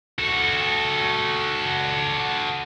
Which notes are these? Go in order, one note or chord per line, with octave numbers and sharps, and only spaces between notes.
F#4 A4